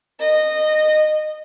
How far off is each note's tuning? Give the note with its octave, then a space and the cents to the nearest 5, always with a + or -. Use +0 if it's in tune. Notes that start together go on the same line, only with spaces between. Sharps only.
D#5 -15